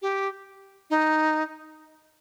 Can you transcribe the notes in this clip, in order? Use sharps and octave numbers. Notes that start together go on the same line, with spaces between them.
G4
D#4